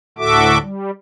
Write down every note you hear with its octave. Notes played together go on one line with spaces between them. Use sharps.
D2 A2 F#4 A4 E5 D6
G3